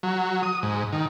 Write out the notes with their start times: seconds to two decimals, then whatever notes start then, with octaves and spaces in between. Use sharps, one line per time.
0.03 F#3
0.43 D#6
0.63 G#2
0.93 D#3